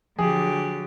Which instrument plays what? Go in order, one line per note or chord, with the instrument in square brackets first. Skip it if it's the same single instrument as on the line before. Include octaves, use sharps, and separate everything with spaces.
[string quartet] D3 F#3 G4 [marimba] F3 [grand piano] G#4